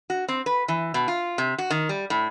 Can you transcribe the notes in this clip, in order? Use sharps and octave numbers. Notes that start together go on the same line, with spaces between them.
F#4
C4
B4
E3
B2
F4
C3
F#4
D#3
G3
A2